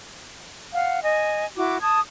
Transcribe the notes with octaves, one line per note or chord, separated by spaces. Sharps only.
F5 F#5
D#5 G#5
E4 F#4 D6
A5 D#6 G#6